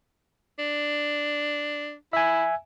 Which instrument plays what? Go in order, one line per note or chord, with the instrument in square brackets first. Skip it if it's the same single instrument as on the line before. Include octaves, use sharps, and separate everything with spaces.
[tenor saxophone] D4
[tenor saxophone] E4 [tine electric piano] E5 G#5